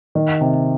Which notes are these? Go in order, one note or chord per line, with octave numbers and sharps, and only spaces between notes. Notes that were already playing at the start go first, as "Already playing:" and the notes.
D#3
C3